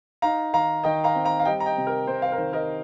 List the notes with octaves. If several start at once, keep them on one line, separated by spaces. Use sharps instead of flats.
D#4 F5 A#5
D#3 F5 A#5
D#3 D#5 G5
F5 A#5
C4
F5 A#5
F5
G3 D#5 G5
A#5
D#5 G5
C3
A#4
C3 C5
C5 F5
A#4
D#3 C5
A#4 D#5